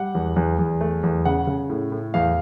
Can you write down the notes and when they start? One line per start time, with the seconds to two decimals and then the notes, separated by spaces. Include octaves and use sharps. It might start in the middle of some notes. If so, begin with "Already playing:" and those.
Already playing: G3 F#5
0.15 E2
0.36 E2
0.59 E2
0.81 A3
1.03 E2
1.25 C#3 F#5
1.47 C#3
1.69 A2
1.92 A2
2.14 E2 F5